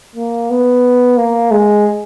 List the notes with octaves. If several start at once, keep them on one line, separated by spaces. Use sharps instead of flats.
A#3
B3
A#3
G#3